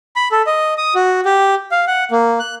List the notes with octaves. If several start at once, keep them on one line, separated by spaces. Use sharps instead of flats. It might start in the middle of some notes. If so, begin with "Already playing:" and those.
B5
A4
D#5
D#6
F#4
G4
F5
F#5
A#3
F#6